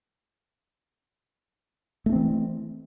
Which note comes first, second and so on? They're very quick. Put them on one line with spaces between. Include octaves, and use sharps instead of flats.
A3 D4 C4 E3